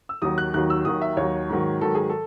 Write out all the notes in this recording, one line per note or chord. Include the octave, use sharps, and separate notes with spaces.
E6
D#2 D#3 F#3 D#6
F#6
D#2 D#3 F#3 F#6
E6
D#2 D#3 F#3 D#6
E5
D#2 D#3 F#3 C#5
G#2 D#3 F#3
G#2 D#3 F#3 A4
G#4
A4